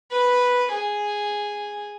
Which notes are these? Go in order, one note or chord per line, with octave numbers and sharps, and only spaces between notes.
B4
G#4